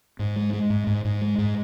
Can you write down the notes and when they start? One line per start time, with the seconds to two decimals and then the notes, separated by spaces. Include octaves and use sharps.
0.19 G#2
0.36 G#3
0.53 G#3
0.70 G#2
0.87 G#2
1.05 G#2
1.22 G#3
1.38 G#2